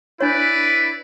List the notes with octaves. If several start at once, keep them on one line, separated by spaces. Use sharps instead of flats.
D4 E4 B4 C#5 D5